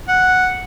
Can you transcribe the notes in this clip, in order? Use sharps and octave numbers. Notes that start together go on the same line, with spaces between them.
F#5